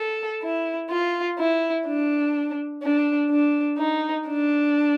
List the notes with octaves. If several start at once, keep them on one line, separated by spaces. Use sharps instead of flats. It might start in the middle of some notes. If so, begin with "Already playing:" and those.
Already playing: A4
E4
F4
E4
D4
D4
D4
D#4
D4